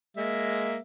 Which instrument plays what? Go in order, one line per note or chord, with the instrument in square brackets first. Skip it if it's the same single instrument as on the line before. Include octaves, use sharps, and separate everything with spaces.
[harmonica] G#3 A#3 E5